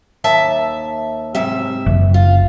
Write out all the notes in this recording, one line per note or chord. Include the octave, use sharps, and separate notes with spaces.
D#2 E5 A5
G#2 C3 E5
F#1
F4